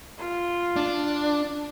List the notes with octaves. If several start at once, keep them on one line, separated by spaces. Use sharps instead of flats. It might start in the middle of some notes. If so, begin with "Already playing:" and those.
F4
D4